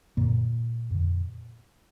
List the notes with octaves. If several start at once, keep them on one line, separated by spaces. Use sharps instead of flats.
F#2 A#2 D3 A#3
F2 D3